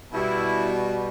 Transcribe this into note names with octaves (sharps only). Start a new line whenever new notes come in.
B2 G3 E4